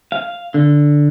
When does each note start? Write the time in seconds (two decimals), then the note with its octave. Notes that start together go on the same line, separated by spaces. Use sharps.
0.12 F5
0.54 D3